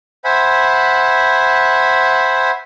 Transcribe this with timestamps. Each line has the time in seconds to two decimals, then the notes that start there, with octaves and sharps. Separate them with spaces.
0.25 C5 E5 F#5 G#5 B5